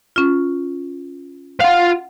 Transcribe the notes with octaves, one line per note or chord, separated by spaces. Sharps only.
C#4 F4
F4 F5 F#5